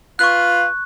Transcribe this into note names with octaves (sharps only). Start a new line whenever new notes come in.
F4 B4 F5 C#6 F#6